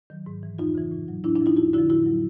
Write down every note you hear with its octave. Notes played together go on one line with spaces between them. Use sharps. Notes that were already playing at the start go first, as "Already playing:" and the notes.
D#3 F#3
G#2
E3
F2 D#4 F4
C#3 E3
A2
F#3
A2 D4 E4
D4 E4
F3
D#4 F4
F2 E4 F#4
D3 F3 E4 F#4
A2 E4 F#4
F#3